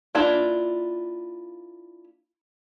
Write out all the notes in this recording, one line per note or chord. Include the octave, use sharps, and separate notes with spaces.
A#3 D4 E4 F4